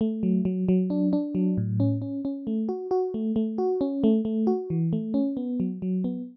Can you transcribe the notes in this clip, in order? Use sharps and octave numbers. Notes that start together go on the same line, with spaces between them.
A3
F#3
F#3
F#3
D4
D4
F#3
A2
C#4
C#4
C#4
A3
F#4
F#4
A3
A3
F#4
C#4
A3
A3
F#4
E3
A3
C#4
B3
F#3
F#3
B3